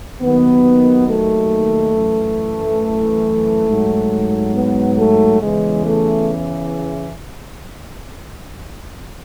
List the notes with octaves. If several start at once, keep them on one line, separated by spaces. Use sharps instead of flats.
D#2 D#3 F#3 B3
A3
F#2 E3
G#2 F#3
B3
A3
E2 C#3 E3 G#3
A3